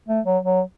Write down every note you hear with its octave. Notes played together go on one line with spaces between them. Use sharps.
A3
F#3
F#3